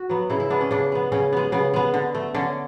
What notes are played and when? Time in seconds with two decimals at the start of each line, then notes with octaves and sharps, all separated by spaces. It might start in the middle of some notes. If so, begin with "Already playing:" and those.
Already playing: F#4
0.10 F#3 B3
0.30 C#3 E4
0.40 E4
0.50 G#3 B3 D4
0.61 C#4
0.71 C#3 D4
0.92 G#3 B3
1.12 C#3 C#4
1.33 G#3 B3
1.52 C#3 B3
1.74 G#3 B3
1.94 D3
2.15 A3
2.35 D3 C#4